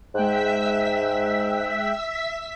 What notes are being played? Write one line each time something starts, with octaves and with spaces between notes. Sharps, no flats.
G#2 G#3 E5 G5 E6 F#6 B6